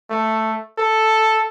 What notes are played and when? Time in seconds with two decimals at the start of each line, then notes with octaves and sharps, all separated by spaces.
0.10 A3
0.78 A4